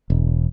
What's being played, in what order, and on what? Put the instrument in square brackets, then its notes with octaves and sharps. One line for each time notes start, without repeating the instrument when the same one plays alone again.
[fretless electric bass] E1